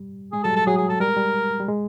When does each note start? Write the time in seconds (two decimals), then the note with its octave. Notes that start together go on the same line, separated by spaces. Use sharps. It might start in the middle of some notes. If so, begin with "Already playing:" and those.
Already playing: G3
0.32 G#3 G#4
0.44 F#3 A4
0.50 G3
0.56 A4
0.66 F#3 G#4
0.78 G#4
0.89 A4
1.00 G3 A#4
1.08 G#3
1.16 G3
1.60 G3
1.68 G#3